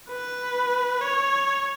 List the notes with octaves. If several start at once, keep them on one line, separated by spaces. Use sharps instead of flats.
B4
C#5